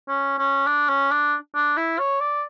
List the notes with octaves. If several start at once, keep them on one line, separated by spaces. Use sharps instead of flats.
C#4
C#4
D4
C#4
D4
D4
E4
C#5
D5